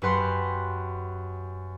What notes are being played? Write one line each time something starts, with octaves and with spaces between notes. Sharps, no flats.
F#2 G4 B4 F#5 C6